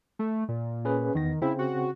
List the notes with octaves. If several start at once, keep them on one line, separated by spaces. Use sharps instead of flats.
A3
A#2
C#4 G#4 B4
E2 D#3 B3 A#6
C#3 C4 E4
F#4